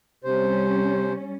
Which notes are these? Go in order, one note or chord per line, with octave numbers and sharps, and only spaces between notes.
C3 G3 C#4 C5